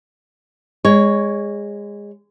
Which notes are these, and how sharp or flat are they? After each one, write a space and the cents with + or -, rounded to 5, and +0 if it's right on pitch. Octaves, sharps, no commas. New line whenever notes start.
G#3 -20 C#5 +5